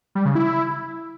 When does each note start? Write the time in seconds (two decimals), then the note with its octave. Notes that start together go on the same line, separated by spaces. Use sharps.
0.15 G3
0.25 C#3
0.35 E4